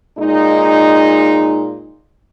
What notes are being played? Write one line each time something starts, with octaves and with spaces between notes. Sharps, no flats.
A#2 G#3 D#4